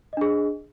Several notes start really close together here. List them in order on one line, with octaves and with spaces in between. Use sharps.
D#5 D4 G#4